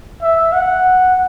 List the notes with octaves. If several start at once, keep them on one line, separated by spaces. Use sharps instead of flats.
E5
F#5